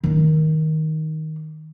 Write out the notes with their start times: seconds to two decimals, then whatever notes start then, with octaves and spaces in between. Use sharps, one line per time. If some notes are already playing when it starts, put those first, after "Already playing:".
0.04 D#3 D#4